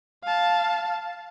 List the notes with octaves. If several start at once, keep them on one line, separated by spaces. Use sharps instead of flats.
F5 A5